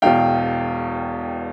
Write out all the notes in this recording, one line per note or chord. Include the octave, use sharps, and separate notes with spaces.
E1 E2 B2 F5 G5